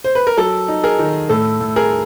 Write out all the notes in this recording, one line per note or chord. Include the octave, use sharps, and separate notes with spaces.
C5
B4
A#4
F#3 A4
D#4
G#4 A#4
D#3
A2 A4
A2
G#4 A#4